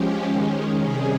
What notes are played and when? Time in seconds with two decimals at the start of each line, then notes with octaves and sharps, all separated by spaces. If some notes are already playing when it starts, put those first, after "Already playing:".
Already playing: F3 G#3 C#4 G4
0.26 D#3 G#3 C#4
0.83 C3 G3 C#4 G#4